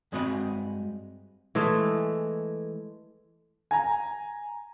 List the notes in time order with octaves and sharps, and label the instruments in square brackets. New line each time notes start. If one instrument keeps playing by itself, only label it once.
[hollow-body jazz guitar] G2 G#3 C4 F#4 D#5 B5
[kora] E3 G#3 A3 D#5
[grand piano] G#5 A#5